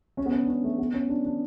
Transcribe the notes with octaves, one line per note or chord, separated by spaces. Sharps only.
C#4
B3
C#4
D4
C#4
A3
B3
C#4
D4
D4